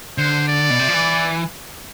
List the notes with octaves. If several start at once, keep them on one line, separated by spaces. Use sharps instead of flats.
D3 C5
D5
B2
C3
F3
E3